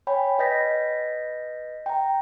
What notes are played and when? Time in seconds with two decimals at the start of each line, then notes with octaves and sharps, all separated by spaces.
0.07 C#5 G5 G#5 B5
0.39 B4 D#5 G6 A#6 B6
1.86 G5 A#5